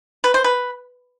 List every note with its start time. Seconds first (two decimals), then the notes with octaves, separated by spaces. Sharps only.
0.24 B4
0.34 C5
0.44 B4